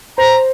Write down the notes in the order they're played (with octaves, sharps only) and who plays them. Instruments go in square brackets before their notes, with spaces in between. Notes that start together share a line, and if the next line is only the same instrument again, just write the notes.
[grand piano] C5 [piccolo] A#5